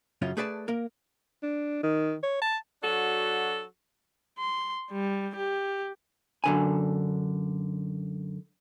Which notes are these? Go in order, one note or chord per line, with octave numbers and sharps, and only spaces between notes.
F#2 C#3 C#4 F4
A3 G#4 B4 D5 E5 A5
A#3 A#4
D4
D#3
C#5
A5
F#3 D4 F#4 A4
C6
G3
G4
F#2 D3 G#5